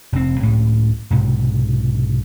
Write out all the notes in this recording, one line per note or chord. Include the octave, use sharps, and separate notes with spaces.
F1 C4
C#2 A2
B1 G#2 C3